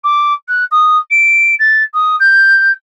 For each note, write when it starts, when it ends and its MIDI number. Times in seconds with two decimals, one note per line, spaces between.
0.04 0.33 86
0.48 0.64 90
0.71 0.98 87
1.10 1.55 98
1.59 1.83 93
1.94 2.16 87
2.19 2.72 91